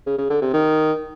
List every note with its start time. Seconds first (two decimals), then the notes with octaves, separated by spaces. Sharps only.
0.06 C#3
0.18 C#3
0.30 D3
0.41 C3
0.53 D#3